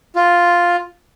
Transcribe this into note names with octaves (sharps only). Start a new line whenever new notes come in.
F4